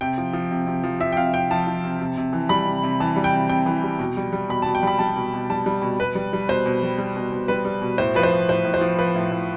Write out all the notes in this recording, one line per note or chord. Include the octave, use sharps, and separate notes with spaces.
C3 G5
F3
F3
C3
C3
F3
F3 E5
G5
C3 F5
C3 G5
F3 A5
F3
C3
C3
C3
E3
G3 B5
C3
C3
E3 A5
G3
G5
C3
C3 G5
E3
G3
B2
G3
G3
B2 B5
B2 A5
G5
G3 B5
G3 A5
B2
B2
G3 A5
G3
B2
B2 B4
G3
G3
B2 C5
B2
G3
G3
B2
B2
G3 B4
G3
B2
A2 C5
F3 B4
C5
F3
A2 C5
A2
C5
F3
F3 B4
A2
A2